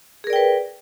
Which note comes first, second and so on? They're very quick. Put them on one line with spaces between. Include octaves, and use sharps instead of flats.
G#4 A#4 D5 G5 B4